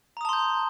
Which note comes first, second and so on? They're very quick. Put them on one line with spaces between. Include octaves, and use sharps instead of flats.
A#5 D#6 A5 C6 G6